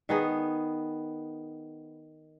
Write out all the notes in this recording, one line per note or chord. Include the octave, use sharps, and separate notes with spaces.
D#3 B3 G#4